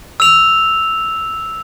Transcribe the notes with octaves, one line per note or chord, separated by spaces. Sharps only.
E6 F7